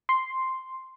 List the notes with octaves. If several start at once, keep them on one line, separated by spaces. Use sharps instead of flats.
C6